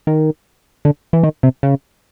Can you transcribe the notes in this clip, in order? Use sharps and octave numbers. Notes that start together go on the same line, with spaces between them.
D#3
D3
E3
D#3
C3
C#3